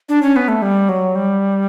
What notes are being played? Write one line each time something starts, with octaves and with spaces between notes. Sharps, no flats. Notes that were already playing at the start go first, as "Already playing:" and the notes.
D4
C#4
B3
A3
G3
F#3
G3